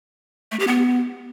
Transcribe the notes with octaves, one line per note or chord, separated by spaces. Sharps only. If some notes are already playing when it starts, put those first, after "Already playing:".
A3
G4
B3